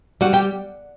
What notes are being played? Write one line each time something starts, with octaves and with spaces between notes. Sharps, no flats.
G3 F#4 F#5
G4 G5